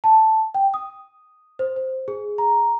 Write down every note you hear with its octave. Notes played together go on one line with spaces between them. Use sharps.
A5
G5
D#6
C5
C5
G#4
A#5